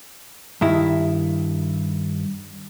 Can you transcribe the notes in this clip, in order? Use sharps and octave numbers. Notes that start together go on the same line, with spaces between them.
G2 D#3 E4